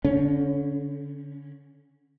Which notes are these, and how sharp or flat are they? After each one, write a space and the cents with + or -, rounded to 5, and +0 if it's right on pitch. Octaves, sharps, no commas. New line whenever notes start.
D3 -30 C#4 +0